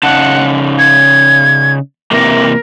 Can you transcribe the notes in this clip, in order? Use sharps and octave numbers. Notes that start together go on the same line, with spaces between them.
C#3 D#4 F#5 A5
G#6
C3 E3 A#3 A#4